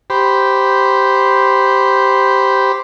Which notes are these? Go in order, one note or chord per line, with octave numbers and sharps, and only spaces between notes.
G4 C5 B5